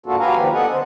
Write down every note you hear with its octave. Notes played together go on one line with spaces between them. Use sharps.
G#2 A#3 D4 F4 F#4 A4
F#3 G4 B4 F5 G#5 A#5
D#3 F3 G3 A#3 G4 B4
B3 D4 A4 D#5 F#5 G#5
D3 C5